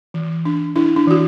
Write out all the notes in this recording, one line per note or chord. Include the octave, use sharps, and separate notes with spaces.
E3
D4
D4 E4
D4
E3 F#4